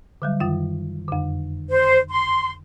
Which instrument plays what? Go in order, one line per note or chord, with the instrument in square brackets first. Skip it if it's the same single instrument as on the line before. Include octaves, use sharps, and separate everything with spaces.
[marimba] D3 F#3 G3
F#2 D#3 F4
F2 D3
[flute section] C5
C6